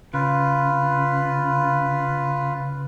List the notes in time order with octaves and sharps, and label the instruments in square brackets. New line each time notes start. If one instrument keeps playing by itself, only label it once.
[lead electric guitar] C#3 [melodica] F4 B4